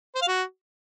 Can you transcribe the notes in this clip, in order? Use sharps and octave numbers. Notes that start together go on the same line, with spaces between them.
C5
F5
F#4